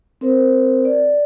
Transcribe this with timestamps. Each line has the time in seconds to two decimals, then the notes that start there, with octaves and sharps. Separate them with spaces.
0.21 C4 A#4 C5
0.85 D5